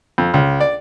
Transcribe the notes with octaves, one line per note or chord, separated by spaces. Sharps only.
F2
C#2
D5